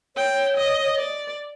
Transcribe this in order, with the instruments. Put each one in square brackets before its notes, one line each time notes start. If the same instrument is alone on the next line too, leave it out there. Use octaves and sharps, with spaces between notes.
[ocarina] C#5 [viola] G5
[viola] D#5
D5